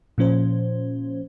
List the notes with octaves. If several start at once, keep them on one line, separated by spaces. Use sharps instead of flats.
A#2 F3 C#4 C5